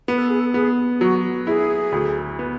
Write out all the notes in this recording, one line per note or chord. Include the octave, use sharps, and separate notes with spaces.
B3 B4
A4
G#4
A4
B3 G#4
F#3 F#4
E4 G#4
D2
B3